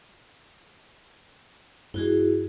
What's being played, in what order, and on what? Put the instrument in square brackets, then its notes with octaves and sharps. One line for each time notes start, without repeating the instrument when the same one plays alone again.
[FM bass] G2 [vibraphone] E4 F#4 G#4